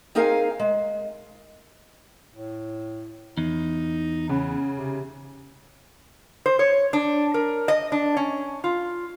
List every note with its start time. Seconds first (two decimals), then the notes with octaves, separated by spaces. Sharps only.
0.15 C4 D#4 G#4 A#4 F5 G#5
0.60 G#3
2.34 A2
3.38 E2 D#4
4.29 C#3 B3
4.78 C3
6.46 C5
6.59 C#5
6.93 D4
7.34 A#4
7.68 D#5
7.92 D4
8.17 C#4
8.64 F4